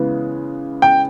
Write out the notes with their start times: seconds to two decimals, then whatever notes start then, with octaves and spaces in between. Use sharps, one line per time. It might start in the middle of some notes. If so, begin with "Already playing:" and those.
Already playing: C#3 E3 G#3 B3
0.82 G5